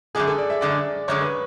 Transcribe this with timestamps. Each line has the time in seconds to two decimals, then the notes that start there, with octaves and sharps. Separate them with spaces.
0.15 F#2 D3 G#3 G#4
0.27 A4
0.38 D5
0.50 E5
0.61 F#2 D3 G#3 D5
1.08 F#2 D3 G#3 C#5
1.21 B4